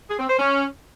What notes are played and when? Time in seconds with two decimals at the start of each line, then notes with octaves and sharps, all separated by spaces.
0.09 G#4
0.19 C4
0.29 C5
0.39 C#4